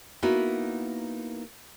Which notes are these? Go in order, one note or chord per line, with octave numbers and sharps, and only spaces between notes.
A#3 B3 D#4 E4 F#4